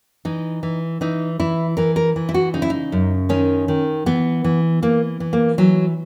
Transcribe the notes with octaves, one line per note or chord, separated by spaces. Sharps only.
E3 D#4
E3
E3 D#4
E3 E4
E3 A#4
A#4
E3
E4
F#4
C#3 D#4
E4
D#4
F#2
D#3 C#4
D#3
E3 B3
E3
E3 A#3
E3
A#3
E3 F#3